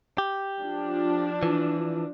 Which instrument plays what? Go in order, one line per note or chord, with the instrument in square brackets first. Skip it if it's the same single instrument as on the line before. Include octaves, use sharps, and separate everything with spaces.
[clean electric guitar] G4
[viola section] F3 D4
[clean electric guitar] E3